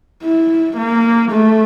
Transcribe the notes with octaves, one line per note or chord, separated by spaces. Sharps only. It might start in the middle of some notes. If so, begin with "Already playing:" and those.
E4
A#3
A3